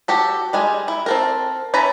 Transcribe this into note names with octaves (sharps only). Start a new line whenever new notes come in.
F#4 G4 A4
G3 G#3 G#5
E4
C4 A4 A#4
C#4 E4 B4 A5 A#5